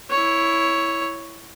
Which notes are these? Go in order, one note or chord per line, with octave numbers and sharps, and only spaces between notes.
E4 C#5